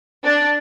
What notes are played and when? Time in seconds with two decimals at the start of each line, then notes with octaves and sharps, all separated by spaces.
0.23 D4